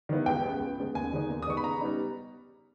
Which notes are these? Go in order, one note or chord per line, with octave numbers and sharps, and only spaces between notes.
D#3 G3 B3 E4
C#2 G5
C#3 G#3 B3
C#2
C#3 G#3 B3
D#2 G#5
D#3 G#3 B3 D#4
D#2
D#6
D#3 G#3 B3 D#4 C#6
B5
C#3 A#5
G3 B3 D#4